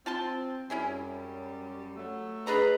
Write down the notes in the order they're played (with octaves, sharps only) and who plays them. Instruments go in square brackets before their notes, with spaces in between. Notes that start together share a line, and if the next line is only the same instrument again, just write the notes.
[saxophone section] C4 [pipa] F4 A5 C6
[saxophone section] F#2 G3 [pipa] C#4 E4 G#4
[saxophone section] F#3 A3
[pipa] D4 D#5 A#5 [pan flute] G#4 [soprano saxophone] B4